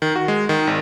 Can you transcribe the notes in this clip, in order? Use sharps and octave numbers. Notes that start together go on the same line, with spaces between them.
D#3
F#4
G#3
D#3
G#1